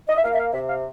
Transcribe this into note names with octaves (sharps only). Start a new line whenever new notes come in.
D#5
E5
A#3 F5
E5
F5
C3 E5
F5